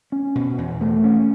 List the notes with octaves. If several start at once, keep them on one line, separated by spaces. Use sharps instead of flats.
C#4
B2
E2
A3
C#4